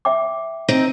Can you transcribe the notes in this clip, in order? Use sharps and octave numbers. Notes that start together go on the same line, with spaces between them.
E5 G5 D6
C4 D#4